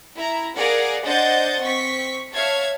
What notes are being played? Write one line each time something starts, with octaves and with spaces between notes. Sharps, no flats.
E4 A#5
G#4 A#4 D5 F5 F#5
D4 C5 D#5 F#5 G6 A6
C4 C#6 B6
C#5 E5 F5 A5 G#6